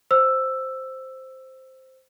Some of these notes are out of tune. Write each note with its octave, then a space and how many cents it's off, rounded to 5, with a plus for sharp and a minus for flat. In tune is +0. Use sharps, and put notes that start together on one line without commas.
C5 +0 E6 +5